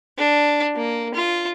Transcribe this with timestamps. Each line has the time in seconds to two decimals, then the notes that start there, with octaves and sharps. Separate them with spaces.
0.18 D4
0.76 A#3
1.15 F4